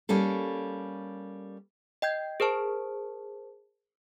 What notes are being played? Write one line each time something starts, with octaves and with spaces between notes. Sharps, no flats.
G3 A#3 C#4 A4
D#5 G5 G6 G#6
G#4 A#4 C5 A5